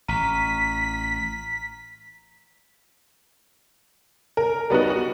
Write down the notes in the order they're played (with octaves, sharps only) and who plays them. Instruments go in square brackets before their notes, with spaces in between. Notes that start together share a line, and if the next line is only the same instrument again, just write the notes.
[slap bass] A1 [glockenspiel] A#5 F6 D#7 [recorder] B6
[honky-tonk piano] A#4
G3 B3 D#4 F#4
F#4